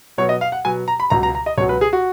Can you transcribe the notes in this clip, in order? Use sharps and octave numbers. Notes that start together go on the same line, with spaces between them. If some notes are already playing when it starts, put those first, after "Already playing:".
B2 F#3 B3 C#5
D#5
F5
F#5
B2 F#3 B3 G#5
A#5
B5
C#2 B2 F#3 A#5
A#5
A#5
D#5
C#2 B2 F#3 C#5
B4
G#4
F#4